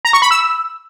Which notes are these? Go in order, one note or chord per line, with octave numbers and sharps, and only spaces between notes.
A#5
C#6
B5
E6